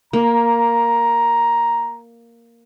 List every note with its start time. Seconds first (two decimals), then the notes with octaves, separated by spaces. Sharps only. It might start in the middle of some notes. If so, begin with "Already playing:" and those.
0.13 A#3 A#5